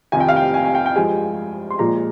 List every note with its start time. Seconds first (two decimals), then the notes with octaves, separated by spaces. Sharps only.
0.12 F2 C3 D#3 G3 G#5
0.20 G5
0.29 F5
0.36 G5
0.54 G#5
0.64 G#5
0.75 G5
0.86 G5
0.96 G2 F3 G#3 G#5
1.71 C6
1.79 A#2 F3 G#3 A#5